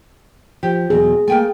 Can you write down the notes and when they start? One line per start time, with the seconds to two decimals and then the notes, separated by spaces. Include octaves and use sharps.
0.63 F3 G4
0.90 E2 B2 F#3 G#4
1.28 A3 A#3 A#4 G5 G#5